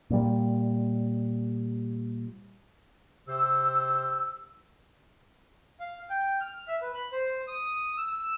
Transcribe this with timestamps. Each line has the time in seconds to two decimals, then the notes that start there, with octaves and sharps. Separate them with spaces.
0.10 A#2 G3
3.28 C3 G4 C5 E6
5.80 F5
6.10 G5
6.41 F6
6.68 E5
6.82 B4
6.94 B5
7.12 C5
7.47 D#6
7.98 E6
8.11 E6